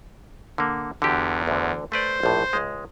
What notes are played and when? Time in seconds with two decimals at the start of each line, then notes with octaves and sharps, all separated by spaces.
0.58 D3 A#3
1.02 E2 D3 F#4 G4
1.47 D2 D3
1.92 A3 B4 C5 D5
2.23 A#1 A2
2.53 C#2 G#3